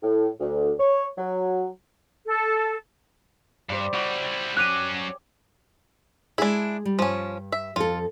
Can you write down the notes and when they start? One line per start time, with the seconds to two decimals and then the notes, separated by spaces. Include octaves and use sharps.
0.01 A2
0.39 D2
0.78 C#5
1.17 F#3
2.26 A4
3.69 G2 G3 C5
3.93 G3 E4 F#4
4.57 F#3 C#4 G5 G#5 D6 F#6 D#7
6.38 G#3 D4 E4 G#4
6.85 G3
6.99 G2 F3 C#4
7.52 E5
7.76 F2 F4 A4